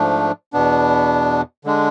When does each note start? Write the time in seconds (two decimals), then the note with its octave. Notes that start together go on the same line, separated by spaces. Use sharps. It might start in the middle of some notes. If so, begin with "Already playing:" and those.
Already playing: G#2 F3 A3 D4
0.53 E2 B2 B3 D4
1.64 D3 G#3 D4